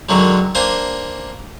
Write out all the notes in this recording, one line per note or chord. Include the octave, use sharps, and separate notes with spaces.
F#2 D3 D#3 F#3 G#3
A#3 D4 C5 G#5